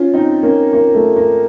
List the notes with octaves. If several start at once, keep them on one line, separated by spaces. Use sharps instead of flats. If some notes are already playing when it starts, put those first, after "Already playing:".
Already playing: C#4 F4
C4 D#4
A#3 C#4
A#3
A3
A#3